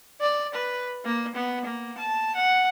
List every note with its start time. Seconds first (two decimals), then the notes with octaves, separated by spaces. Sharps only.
0.21 D5
0.54 B4
1.05 A#3
1.35 B3
1.65 A#3
1.98 A5
2.35 F#5